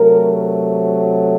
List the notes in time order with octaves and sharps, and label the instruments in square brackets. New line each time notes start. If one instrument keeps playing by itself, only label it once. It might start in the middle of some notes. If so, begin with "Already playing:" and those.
Already playing: [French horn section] C3 F#3 A3 A#4